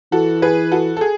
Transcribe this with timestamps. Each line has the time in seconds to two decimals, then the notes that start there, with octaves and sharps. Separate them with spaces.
0.12 E3 F#4 A4
0.42 G#4 B4
0.71 F#4 A4
0.97 A4
1.01 G#4